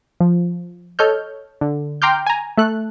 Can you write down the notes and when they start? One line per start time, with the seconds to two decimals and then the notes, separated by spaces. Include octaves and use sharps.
0.20 F3
0.99 A4 C#5 D#5 F6 G6
1.61 D3
2.02 G5 A#5 C6 D6 F6 G6
2.26 G#5 A#5
2.58 A3 A4 F#6